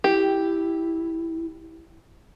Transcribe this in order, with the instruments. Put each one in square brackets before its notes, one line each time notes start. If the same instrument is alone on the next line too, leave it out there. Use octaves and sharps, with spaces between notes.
[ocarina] E4 [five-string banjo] G4